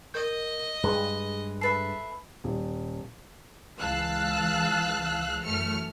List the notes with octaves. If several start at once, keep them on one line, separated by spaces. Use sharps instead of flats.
A#4 D#5 G6
G2 G#3 G#4 B4
A4 B4 E5 A6 C7
D#1
C#2 E3 F5 A5 E6 F#6
F#2 E3 A3 F6 C#7